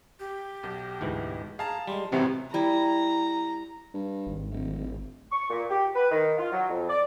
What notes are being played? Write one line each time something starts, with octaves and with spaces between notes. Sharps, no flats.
G4
B1
D2 G#2 E3
G#4 F5 A5 A#5
G3 G#3 C6
G#1 A2 C3 E3 F#3 A#5
G3 E4 A#5
G2
G#1
D1
C#6
A#2
G4
B4
D#3
F4
F#3
F2
D5